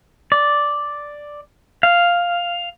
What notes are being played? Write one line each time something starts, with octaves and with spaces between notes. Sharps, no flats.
D5
F5